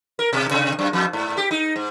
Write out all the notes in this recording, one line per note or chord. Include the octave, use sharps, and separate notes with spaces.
A#4
B2
C3
F#2
F2
G#2
G4
D#4
G#2